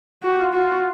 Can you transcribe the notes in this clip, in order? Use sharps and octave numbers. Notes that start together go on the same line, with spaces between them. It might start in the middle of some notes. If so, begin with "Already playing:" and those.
F#4 G4
F4
F4 F#4